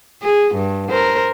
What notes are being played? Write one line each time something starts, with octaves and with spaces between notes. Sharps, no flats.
G#4
G2
A#4 C5